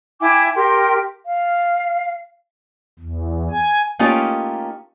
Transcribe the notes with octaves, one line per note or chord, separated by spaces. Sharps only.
E4 G5 G#5 D6
G4 A#4 G5 C6
F5
E2
G#5
A3 A#3 C#4 D#4 F4 G4